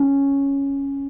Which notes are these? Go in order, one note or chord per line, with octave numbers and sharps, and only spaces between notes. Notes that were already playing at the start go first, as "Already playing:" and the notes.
Already playing: C#4